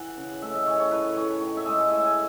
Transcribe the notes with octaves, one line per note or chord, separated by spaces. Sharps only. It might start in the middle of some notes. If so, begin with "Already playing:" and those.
Already playing: E3 F#5
C#3
A2 E5
D#5
E3 C#5
C#5
A2 B4
A2 C#5
D#3 C#5
E5
G#3 D#5
A2 E5
G#5